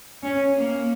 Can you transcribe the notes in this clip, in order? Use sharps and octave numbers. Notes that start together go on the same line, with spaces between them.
C#4
A#3